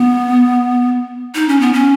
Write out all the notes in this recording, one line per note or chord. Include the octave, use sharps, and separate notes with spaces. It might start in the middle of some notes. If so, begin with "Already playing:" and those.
Already playing: B3
D#4
C#4
B3
C#4